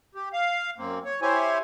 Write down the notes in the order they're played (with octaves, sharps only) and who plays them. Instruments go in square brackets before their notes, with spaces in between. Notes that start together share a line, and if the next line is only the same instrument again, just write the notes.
[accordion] G4
F5
F#2 A#3 C4
C#5
E4 G4 C5 C#5 G#5